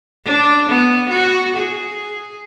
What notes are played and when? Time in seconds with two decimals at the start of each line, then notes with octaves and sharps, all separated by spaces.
0.25 D4
0.68 B3
1.09 F#4
1.56 G#4